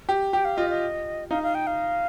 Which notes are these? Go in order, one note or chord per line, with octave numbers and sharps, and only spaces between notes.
G4
G4 G5
F5
F4 D#5
D#5
D#4 F5
F5
G5
F5